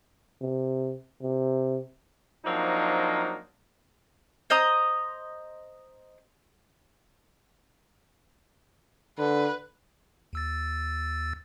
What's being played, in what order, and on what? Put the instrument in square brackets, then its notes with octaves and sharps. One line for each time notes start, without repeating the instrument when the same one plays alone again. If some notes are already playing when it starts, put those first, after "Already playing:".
[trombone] C3
C3
[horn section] F3 F#3 A#3 C4 D4 D#4
[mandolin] C5 D#5 A#5 D#6
[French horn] D3 [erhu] B4
[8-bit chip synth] D#2 E6 A6